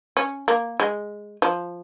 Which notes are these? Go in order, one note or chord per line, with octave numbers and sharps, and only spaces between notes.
C#4
A#3
G#3
F3